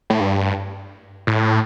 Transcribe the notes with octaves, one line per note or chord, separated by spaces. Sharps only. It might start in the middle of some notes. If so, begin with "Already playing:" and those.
A2
G2
A2